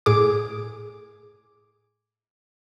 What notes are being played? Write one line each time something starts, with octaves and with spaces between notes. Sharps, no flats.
A2 G#4 D6